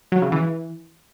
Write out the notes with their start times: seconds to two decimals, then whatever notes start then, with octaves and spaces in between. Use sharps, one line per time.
0.12 F#3
0.22 C#3
0.32 E3